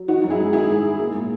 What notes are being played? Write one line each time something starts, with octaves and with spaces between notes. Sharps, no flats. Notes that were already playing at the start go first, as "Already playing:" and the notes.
Already playing: F#3
E3 D#4 F#4
F#2
E4 G#4
G#3
D#3 E4 G#4
G#2
G#3
A#3
A#2